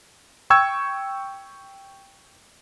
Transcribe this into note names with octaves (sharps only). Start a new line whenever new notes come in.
G5 C#6 E6 G#6